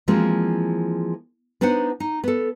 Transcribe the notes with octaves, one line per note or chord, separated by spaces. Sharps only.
E3 F3 G#3 A#3 C4 F#4
B3 D4 D#4 C5 F#5
D#4
B3 A4